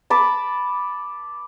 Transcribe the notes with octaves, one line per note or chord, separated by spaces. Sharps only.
A5 B5 D6